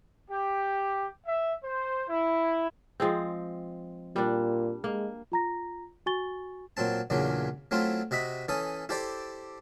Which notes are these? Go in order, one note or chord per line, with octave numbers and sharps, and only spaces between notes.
G4
E5
C5
E4
F3 G#3 C4
A#2 G3 D4
G#3 A#3
F4 A#5 A#6
F#4 G#5 C#6 A6 G7
A#2 F#3 C4 A5
E2 A#2 C#3 E3 F#3 D4
F#3 A3 C4 E4 F4
C3 F#4 D#5 E5 B5
E3 C#4 A4 D#6
E4 G4 A4 C5 D5